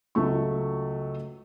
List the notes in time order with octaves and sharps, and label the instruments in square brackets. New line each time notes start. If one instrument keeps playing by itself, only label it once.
[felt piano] C#2 F#3 A3 C#6